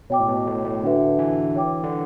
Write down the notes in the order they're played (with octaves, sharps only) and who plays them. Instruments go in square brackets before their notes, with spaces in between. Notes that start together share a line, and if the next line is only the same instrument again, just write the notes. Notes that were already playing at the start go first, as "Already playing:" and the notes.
[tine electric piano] B2 [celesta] C#5 G5 D6
[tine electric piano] A2
B2
A2
A2
[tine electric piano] D3 [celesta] D4 F#4 B4 E5
[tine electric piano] E3
[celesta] C#5 G5 D6
[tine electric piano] D3